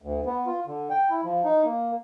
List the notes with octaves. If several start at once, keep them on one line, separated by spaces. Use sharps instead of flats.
D2
B3
F4
D3
G5
E4
F3
D#4
A#3